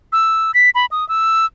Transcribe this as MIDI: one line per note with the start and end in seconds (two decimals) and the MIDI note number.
0.13 0.51 88
0.54 0.70 95
0.75 0.86 83
0.91 1.07 87
1.09 1.46 88